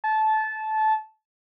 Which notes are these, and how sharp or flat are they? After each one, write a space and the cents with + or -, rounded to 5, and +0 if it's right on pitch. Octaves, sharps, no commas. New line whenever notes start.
A5 -20